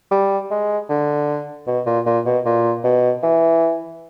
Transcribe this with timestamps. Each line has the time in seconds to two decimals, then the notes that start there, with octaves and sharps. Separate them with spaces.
0.11 G3
0.51 G#3
0.89 D3
1.67 B2
1.86 A#2
2.06 A#2
2.25 B2
2.45 A#2
2.84 B2
3.23 E3